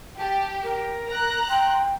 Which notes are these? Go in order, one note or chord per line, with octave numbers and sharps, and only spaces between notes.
G4 A5
A#4
A#5 F#6
G5 C6